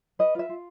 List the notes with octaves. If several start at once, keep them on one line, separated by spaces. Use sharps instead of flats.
B4 D#5
F4 E5
F4